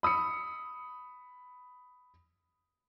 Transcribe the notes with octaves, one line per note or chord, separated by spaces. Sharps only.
B5 D#6 E6 C#7